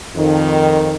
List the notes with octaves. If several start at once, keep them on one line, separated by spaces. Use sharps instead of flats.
F2 D#3